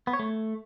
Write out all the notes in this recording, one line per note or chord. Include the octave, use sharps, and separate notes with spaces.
B3
C#5
A3